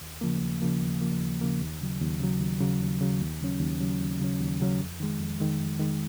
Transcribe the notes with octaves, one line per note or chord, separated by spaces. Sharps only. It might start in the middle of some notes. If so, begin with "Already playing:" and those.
D#2
C#3 F3 A#3
D#2
C#3 F3 A#3
D#2
C#3 F3 A#3
D#2
C#3 F3 A#3
D#2
C#3 F#3
D#2
C#3 F#3
D#2
C#3 F#3
D#2
C#3 F#3
D#2
C#3 F#3 C#4
D#2
C#3 F#3 C#4
D#2
C#3 F#3 C#4
D#2
C#3 F#3 C#4
F2
D#3 G#3
F2
D#3 G#3
F2
D#3 G#3